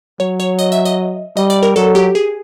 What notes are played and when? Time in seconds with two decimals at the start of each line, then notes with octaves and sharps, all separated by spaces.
0.20 F#3 C#5
0.40 C#5
0.59 D#5
0.72 E5
0.85 D#5
1.36 G3 D#5
1.50 D5
1.63 A#4
1.76 F#3 A4
1.95 G4
2.15 G#4